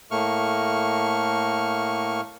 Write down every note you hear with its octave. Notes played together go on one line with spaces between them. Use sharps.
A2 A3 A#3 C#6 F6